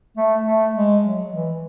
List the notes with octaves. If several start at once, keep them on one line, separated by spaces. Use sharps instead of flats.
A3
A3
G#3
F#3
E3